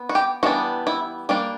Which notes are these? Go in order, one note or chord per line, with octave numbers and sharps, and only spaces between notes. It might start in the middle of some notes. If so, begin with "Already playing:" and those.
Already playing: B3
F#4
G4
E3 G3 B3 D4 F#4
E4
G3 A#3 D4